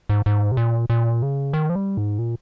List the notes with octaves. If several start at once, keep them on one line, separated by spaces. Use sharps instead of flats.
G#2
G#2
C3
A#2
A#2
C#3
D#3
F3
G3
G#2
A#2